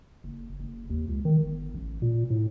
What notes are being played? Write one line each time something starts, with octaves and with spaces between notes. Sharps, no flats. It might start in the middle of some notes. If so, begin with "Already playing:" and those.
F#1
F#1
D#2
C#2
D#3
G1
A1
A#2
A2